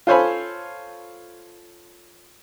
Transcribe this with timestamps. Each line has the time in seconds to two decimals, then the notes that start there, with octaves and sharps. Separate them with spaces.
0.07 F4 A4 C5 C#5 G#5 B5